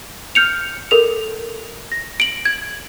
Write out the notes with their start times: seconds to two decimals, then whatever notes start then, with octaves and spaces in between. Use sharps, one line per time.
0.35 F6 G6 C#7 F7
0.91 A4 A#4 F7
1.92 A#6
2.20 D7 F#7
2.45 G#6